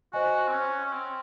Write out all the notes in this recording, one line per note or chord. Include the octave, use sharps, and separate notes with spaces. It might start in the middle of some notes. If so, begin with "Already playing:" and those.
F#4 C5 D#5 G#5
C4
C#4
C#4
C4